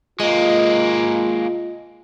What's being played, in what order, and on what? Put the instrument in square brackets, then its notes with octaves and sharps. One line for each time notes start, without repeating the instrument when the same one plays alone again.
[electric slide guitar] G#3 A#3 [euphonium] F4 [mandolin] D#5